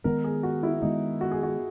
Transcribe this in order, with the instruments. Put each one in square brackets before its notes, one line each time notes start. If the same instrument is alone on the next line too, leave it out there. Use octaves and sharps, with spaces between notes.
[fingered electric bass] D#3 G#3 B3 [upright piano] A#4
[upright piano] G#4
F#4
E4
[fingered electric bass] D#3 G#3 B3 [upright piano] D#4
[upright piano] F#4
G#4
F#4